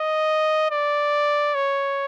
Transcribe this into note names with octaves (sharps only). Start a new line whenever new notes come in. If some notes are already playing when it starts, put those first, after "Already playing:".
Already playing: D#5
D5
C#5